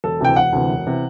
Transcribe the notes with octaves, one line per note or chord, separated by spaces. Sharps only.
E1 A4
D2 C3 E3 G5
E1 F#5
D2 C3 E3
E1
C3 E3